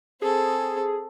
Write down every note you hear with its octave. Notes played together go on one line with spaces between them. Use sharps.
C4 G#4 A4